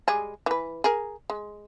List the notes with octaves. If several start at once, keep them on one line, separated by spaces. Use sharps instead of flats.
G3 G#3 G#4
E3 B4
G#4 A#4
G#3